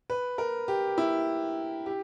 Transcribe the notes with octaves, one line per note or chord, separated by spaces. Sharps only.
B4
A#4
G4
E4
G4